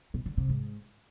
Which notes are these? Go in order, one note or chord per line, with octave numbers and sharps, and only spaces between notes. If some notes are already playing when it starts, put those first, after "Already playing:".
B2
D3
C3
G#2